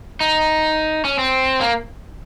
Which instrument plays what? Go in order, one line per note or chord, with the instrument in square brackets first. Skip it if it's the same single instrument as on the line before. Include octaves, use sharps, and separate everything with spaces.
[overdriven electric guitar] D#4
C#4
C4
A#3